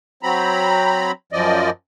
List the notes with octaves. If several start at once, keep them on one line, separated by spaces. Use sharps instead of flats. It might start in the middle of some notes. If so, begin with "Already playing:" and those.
F#3 C4 A#5 B5
F#2 F3 D5 D#5